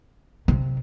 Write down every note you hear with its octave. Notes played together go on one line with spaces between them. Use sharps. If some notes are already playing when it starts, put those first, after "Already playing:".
C3